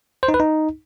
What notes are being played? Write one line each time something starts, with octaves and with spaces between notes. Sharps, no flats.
C5
D#4
B4
D#4